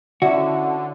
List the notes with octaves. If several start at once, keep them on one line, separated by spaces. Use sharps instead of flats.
D3 C#4 D4 E4 F#4